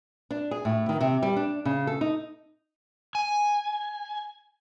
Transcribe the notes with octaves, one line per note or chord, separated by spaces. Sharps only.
D4
G#4
A2
D#3
C3
G3
D4
C#3
A4
D#4
G#5